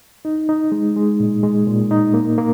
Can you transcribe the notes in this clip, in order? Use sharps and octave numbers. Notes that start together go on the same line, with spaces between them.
D#4
D#4
G#3
G#3
A#2
G#3
A#2
D#4
A#3
A#3